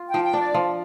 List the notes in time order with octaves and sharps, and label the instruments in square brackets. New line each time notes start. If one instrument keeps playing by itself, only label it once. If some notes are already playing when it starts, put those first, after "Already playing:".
Already playing: [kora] F4
[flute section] G5
[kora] F3
[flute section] G5
[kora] D4
[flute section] D5
[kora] F3